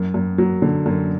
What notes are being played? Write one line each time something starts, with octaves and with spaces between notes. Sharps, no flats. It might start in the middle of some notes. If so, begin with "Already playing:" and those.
Already playing: F#2
F#2
F#3
D3
F#2